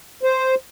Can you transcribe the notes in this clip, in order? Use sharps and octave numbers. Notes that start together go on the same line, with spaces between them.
C5